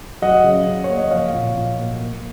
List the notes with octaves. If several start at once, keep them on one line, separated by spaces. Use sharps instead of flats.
F#3 D#5 F#5
C#3
C#3
C#5
A#3
D#5
F3 C#5 F5
A#2
A#2
A#3
A#3